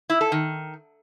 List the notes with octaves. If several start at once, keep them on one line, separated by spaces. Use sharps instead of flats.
E4
A4
D#3